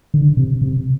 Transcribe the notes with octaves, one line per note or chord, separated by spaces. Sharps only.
D3
C3
C3